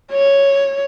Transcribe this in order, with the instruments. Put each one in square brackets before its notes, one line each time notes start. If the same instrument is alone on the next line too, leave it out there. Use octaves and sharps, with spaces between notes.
[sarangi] C#5